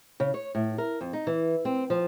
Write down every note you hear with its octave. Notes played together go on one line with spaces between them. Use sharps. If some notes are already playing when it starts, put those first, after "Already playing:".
C#3
C#5
A2
A#4
F2
D#4
E3
C4
F3